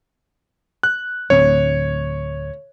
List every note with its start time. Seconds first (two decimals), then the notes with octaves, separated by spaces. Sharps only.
0.83 F#6
1.30 D1 D2 C4 C#5